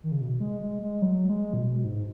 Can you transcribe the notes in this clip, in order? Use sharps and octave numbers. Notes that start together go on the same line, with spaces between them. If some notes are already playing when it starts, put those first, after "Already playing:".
D#3
C#3
B2
G#3
G#3
G#3
F#3
G#3
A#2
B2
G#2